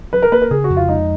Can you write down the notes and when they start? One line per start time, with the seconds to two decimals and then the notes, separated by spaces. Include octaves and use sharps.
0.13 F#3 B4
0.22 A#4
0.32 A#3 B4
0.42 A#4
0.51 C#3 G#4
0.64 F#4
0.70 F2
0.77 F4
0.89 G#3 D#4